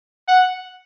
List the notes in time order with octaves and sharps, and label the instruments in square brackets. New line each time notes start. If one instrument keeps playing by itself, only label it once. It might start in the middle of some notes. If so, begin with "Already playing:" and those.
[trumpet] F#5